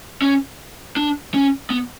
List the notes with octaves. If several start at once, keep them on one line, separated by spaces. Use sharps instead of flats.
C#4
D4
C#4
B3